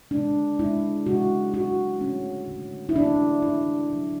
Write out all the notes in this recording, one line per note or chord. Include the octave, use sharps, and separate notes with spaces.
C#3 G#3 D4
C#3 G#3 E4
C#3 G#3 F#4
C#3 G#3 F#4
D3 A3 C#4
D3 A3
E4
D3 A3 D4
D3 A3 E4
C#3 F#3 A3